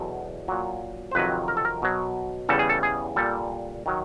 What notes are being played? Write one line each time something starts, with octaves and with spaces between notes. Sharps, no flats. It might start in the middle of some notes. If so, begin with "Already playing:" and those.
Already playing: E2 B2 F#3 A4
A#2 F#3
C5
F2 C3 D#3 F#3 B4
A#4
A4
A#4
B2 F#3
E2 C#3 E3 G3 A4
G#4
A4
G#4
A#2 G3 A4
D#3 F#3